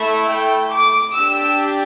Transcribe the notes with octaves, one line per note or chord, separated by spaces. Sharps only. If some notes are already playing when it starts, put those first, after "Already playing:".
Already playing: A3 E4 A4 E5
G5
D6
D4 G4 E6